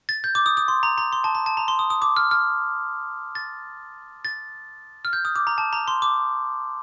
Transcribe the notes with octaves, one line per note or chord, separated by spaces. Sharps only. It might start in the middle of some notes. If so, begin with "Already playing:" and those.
A6
G6
D6
D#6
D#6
C6
A#5
A#5
C6
A5
A#5
A5
A#5
C6
D#6
D#6
D6
F6
F6
A6
A6
F6
G6
D#6
D6
A#5
A5
A#5
C6
D6